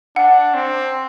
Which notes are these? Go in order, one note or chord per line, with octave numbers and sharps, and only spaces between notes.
D4 F#5
C4